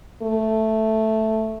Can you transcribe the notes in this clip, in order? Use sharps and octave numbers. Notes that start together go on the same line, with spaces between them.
A3